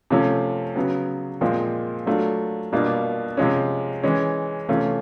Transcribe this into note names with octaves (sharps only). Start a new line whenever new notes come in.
C3 F3 A3 C#4
C#3 F#3 B3
A#2 F3 G#3 C4
F#3 A3 D4 F4
B2 G3 A#3 D4 F4
C3 F3 G#3 C#4
E3 G#3 C#4
C3 E3 A3 C#4 F4